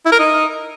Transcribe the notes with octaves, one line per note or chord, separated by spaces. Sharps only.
E4
A#4
D#4